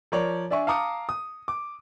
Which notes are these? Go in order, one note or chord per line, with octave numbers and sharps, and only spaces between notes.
F3 A#4 C#5 D5
D4 D5 E5 G#5 C#6
F5 A5 A#5 D6 D#6 C#7
D#6
D6